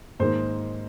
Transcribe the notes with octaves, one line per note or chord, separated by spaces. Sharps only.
G#2 D#3 A#3 C5